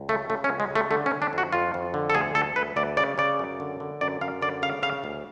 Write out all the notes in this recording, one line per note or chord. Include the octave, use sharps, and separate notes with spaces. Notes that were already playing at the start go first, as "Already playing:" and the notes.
Already playing: C#2
C#3 A3
C#3 A3
C#4
C#2
G#3
C#3
A3
D3 A3
C#4
D3
D4
F2 F#4
F2 F4
F2
D3
A4
D2 G#4
D2 A4
D2 B4
D2 D5
C#3 D5
C#3 D5
F#2
D3
D3
F#2 D5
F#2 F5
D3 D5
C#3 F5
C#3 F5
D2